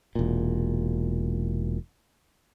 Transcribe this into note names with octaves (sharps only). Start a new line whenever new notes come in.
E1 A#2